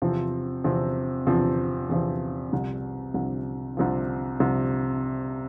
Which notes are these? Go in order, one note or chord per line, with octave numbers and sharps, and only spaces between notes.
E2 C3 F3 C4
E2 C3 F3 C4
E2 C3 F3 C4
E2 C3 F3 C4
C2 C3 F3
C2 C3 F3
C2 C3 F3
C2 C3 F3